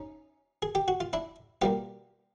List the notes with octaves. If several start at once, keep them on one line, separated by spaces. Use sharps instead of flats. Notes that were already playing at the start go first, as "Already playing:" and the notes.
Already playing: C#4 D#4
G#4
G4
F#4
F4
D4 E4
B2 G3 A#3 F4 G4